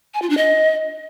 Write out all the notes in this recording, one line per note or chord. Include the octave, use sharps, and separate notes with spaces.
G#5
F4
D4
D#5